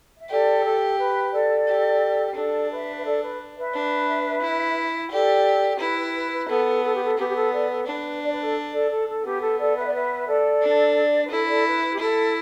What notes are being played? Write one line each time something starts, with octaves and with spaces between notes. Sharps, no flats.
E5
G4 A4 D5
A4
B4
A4 D5
G4
D4 A4 D5
B4 E5
B4
A4 D5
B4
B4 E5
D4
E4
G4 A4 D5
E4 B4
B4
B4
B4
B3 A4
A4
G4
A4
B3 G4
G4
A4
A4 D5
A4
D4 B4
D5
B4
A4 D5
A4 D5
A4
A4
B3 G4
A4
A4 D5
B4 E5
D5
B4 E5
A4 D5
D4
B4
E4 A4
B4
A4 D5
B4 E5
B4
G4
E4 A4